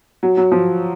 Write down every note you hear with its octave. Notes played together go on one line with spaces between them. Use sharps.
F#3
F#3
F3